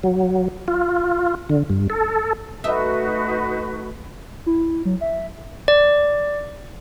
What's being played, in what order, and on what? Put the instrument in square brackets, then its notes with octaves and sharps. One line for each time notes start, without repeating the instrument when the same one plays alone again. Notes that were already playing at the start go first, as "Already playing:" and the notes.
[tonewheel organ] F#3
F4
D3
G2
A4
[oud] A3 D#5 E5 [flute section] D#4 F#4 B4
[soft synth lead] E4
F#3
E5
[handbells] D5